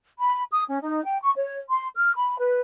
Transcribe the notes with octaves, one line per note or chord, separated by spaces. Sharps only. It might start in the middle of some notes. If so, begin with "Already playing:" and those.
B5
D#6
C#4
D#4
G5
C#6
C#5
C6
F6
B5
B4